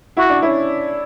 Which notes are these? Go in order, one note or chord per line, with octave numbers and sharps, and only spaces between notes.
E4 F#4
D4
C#4 E4